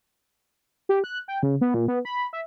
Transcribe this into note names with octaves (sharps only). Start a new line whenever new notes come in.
G4
F#6
G5
C#3
B3
A#2
B3
B5
E5